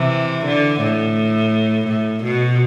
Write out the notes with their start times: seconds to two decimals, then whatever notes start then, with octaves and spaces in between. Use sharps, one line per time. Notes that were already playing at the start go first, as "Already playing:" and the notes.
Already playing: C3 E3
0.45 D3
0.80 A2
1.87 A2
2.24 B2